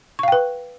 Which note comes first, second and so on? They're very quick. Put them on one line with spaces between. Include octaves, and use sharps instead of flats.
C#6 F5 G5 B4